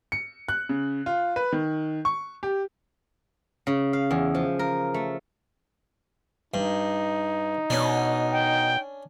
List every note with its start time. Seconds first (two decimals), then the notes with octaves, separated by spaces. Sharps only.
0.12 C#7
0.48 F#6
0.69 C#3
1.06 F4
1.36 B4
1.52 D#3
2.05 C#6
2.43 G4
3.67 C#3
3.93 F5
4.11 E2
4.35 F3
4.59 A#4
4.94 A3
6.54 G2 D#4
7.70 B2 C#4 D4
8.32 G5